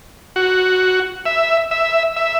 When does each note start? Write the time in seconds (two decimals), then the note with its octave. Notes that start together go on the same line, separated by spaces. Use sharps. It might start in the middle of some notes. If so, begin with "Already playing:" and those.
0.36 F#4
1.26 E5
1.71 E5
2.16 E5